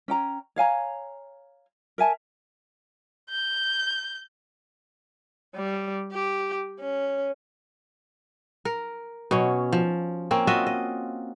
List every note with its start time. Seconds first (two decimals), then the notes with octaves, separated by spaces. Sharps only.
0.08 C#4 G5 A#5
0.56 C#5 F5 G#5 A#5
1.98 A#4 E5 G#5 A5
3.29 G6
5.55 G3
6.12 G4
6.80 C#4
8.65 A#4
9.31 B2 F#3 C#4
9.73 F3
10.31 A#3 C4 C#4
10.47 F4 F#4 D#5 E5
10.67 D#5